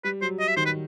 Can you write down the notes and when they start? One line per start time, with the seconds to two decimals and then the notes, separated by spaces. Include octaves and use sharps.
0.04 G3 B4
0.22 F#3 C5
0.39 D#5
0.48 E5
0.57 D#3 C5
0.65 B4